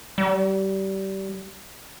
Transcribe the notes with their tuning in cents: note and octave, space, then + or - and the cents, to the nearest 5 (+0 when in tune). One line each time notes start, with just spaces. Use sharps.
G3 -25